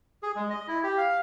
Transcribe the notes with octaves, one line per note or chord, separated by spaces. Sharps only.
G#4
G#3
D#5
E4
G4
F5